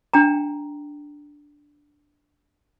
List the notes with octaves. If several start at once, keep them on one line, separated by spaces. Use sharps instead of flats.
D4 G5 A#5